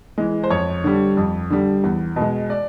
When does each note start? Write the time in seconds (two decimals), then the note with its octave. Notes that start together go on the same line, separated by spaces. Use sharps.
0.18 E3 G#3
0.43 C5
0.50 F2 C#5
0.84 D3 G3
1.17 F2
1.50 D3 G3
1.84 E2
2.16 B2
2.21 G#3
2.50 D5